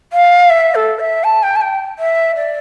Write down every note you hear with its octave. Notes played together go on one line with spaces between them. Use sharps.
F5
E5
A4
E5
A5
G5
A5
G5
E5
D5